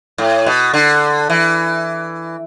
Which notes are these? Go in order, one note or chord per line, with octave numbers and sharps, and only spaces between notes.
A2
B2
D3
E3